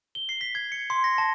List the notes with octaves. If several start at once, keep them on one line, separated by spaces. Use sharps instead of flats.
G7
C7
B6
G#6
C#7
C6
A#6
A5